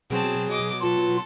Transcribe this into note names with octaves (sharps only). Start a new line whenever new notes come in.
B2 F#3 C4 G#4 A5
D#5 D6
F4 A4 B4